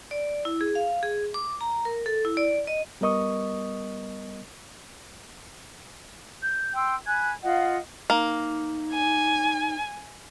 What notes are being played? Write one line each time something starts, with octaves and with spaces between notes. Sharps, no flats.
D5
E4
G#4
F5
G#4
D6
A#5
A#4
A4
E4
D5
D#5
G3 B3 A#4 D#5 C#6 D#6
G6
G5 C6 E6
G#5 B5 F#6 G#6
F4 D#5 F5 F#5
A#3 D#4
G#5